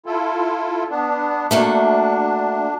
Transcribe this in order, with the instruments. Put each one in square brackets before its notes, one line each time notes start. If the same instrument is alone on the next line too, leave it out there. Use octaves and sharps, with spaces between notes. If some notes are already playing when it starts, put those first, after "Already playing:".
[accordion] E4 F4 A4
B3 D4
[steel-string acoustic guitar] A3 A#3 F#4 [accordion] D4